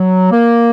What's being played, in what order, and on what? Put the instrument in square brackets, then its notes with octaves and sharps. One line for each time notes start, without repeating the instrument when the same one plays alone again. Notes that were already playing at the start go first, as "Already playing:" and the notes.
Already playing: [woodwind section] F#3
A#3